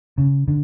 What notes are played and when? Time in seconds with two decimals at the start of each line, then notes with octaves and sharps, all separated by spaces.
0.18 C#3
0.48 D3